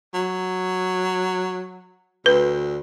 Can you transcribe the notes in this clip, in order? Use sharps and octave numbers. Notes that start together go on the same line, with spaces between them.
F#3
D2 B4